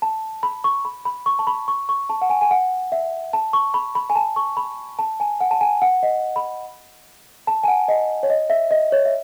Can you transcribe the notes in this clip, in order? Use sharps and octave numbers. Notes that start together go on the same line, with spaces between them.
A5
B5
C#6
B5
B5
C#6
A5
B5
C#6
C#6
A5
F#5
G#5
G#5
F#5
E5
A5
C#6
B5
B5
G#5
A5
C#6
B5
A5
G#5
F#5
A5
G#5
F#5
D#5
B5
A5
G#5
F#5
D#5
C#5
D#5
E5
D#5
C#5
E5